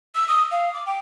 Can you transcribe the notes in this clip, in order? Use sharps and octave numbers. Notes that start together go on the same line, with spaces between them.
E6
D#6
F5
D6
G5